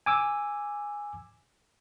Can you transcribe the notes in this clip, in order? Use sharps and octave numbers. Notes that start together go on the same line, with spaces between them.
G#5 D6 E6